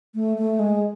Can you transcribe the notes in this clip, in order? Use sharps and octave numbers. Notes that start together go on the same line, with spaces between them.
A3
A3
G#3